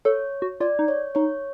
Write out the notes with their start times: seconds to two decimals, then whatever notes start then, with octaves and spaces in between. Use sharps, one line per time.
0.05 A4 C#5
0.42 F#4
0.60 F4 D5
0.79 D#4
0.88 C#5
1.15 D#4 C#5